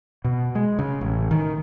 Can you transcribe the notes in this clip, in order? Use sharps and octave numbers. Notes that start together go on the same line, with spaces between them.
B2
G#3
C#3
A1
D#3